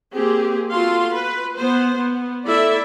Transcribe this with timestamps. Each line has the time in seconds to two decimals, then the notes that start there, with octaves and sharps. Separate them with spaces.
0.14 A#3 C4 G4 G#4
0.69 B3 F4 F#4 A4 F5 C6
1.11 B4
1.57 B3 C5
1.96 B3
2.46 A3 E4 A4 D5 E5